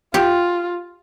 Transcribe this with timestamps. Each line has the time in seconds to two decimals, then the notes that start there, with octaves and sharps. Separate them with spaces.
0.14 F4 G4